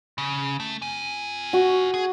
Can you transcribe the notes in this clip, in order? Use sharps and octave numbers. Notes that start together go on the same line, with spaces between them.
C#3
A3
F4 G#5
F#4
G#4